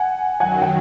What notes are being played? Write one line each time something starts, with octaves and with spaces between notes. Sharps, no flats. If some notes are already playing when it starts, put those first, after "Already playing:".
Already playing: F#5 G#5
F#2 D#3 F#3 F#5 G#5
G5